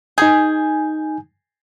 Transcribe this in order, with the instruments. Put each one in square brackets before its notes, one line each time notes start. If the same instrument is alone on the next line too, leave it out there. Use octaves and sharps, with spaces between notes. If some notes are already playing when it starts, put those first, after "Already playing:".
[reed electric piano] D#4 G#5 G6 [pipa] G#4